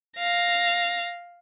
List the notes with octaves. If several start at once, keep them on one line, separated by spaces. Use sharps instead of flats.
F5 A#6